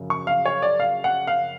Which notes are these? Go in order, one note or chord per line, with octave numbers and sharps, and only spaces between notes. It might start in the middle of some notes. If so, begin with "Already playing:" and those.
Already playing: F#2 C#3 F3
C#6
F5
C#5
D5
F5
F#5
F5